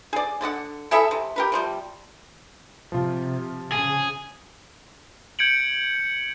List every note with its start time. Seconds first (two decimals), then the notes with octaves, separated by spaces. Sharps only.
0.13 G#4 D5
0.41 D3 D5 D#5 F#5
0.91 E4 G#4 A4 E5
1.11 C3
1.36 G4 A#4 B4
1.52 C3 F3 G3
2.92 C3 F3 F4
3.72 C#3 G#4
5.39 G6 G#6 C#7 D7 F#7